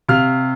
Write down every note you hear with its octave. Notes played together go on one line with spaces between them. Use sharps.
C3 F5 F6